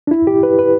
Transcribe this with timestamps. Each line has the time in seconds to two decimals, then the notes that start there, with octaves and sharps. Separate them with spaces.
0.07 D4
0.11 E4
0.27 G4
0.43 B4
0.59 B4